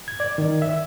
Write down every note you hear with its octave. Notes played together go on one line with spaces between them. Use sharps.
G#6
D5
D#3
E5